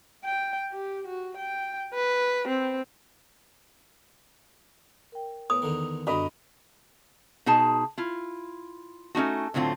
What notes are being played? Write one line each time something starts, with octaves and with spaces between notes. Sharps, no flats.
G5
G4
F#4
G5
B4
C4
A#4 G5
A2 B3 A4 B4 D#6
E2 D3 D#3
F#2 D3 G3 D4 F#4 D#5 B5
B2 D#4 G#4 A5
E4 F4
A3 C#4 D#4 F#4
A2 D3 F#3 C4 F4